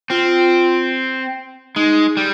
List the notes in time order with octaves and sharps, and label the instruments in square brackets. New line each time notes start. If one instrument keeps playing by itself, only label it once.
[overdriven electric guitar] C4 [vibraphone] F4
[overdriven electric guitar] G#3 [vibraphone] D#4
[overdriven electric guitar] G3